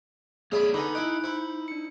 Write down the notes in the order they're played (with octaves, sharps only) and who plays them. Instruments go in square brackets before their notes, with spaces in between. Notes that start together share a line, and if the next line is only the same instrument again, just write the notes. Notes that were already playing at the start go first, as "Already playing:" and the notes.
[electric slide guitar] A#3 C#5 D5 [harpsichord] G#4 E5 B5
[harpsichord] D3 B3 [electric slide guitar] D#4 [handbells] G#5 A#5 B5
[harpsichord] E4 D#5 [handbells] B5 F#6 D7
[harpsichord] E4 [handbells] C5 B5
[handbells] D4 C#7